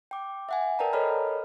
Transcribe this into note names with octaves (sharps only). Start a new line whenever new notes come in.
G5 D6
E5 F#5 G#5
A#4 B4 D5 G5 A5 A#5
A4 A#4 C#5 D#5 B5 F6